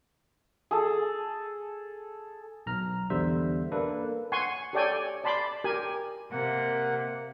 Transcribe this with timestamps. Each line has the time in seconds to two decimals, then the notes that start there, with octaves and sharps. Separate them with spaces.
0.71 G#4 A4
2.66 B1 A#5 F6
3.10 E2 D3 G3 C5 E5
3.72 A#3 D4 A4 B4
4.32 F#5 G#5 C6 C#6
4.73 G4 A4 C#5 D5 G5 G#5
5.24 D5 A5 B5 C6 D6
5.64 G4 A#4 G#5
6.32 C3 A#3 F#5